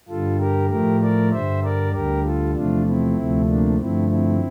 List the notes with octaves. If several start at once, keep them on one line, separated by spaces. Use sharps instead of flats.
G2 D3 G3 F4 A4
G4 A#4
A2 F3 A3 G4 A#4
A#4 D5
G2 D3 G3 C5 E5
A#4 D5
D2 D3 G3 G4 A#4
F4 A4
E2 C3 F3 A3 D4 F4
C4 E4
D2 C3 F3 A3
A#3 D4
G2 D3 F3 A3 C4 E4
C4 E4